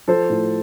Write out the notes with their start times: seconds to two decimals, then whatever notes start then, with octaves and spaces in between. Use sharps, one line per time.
0.08 F3 A4 C5
0.30 A2